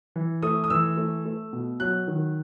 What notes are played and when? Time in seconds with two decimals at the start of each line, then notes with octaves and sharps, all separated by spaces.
0.16 E3
0.43 A3 D#6
0.64 D#6
0.70 E3 E6
0.97 A3
1.25 A3
1.53 B2
1.80 F#3 F#6
2.07 D#3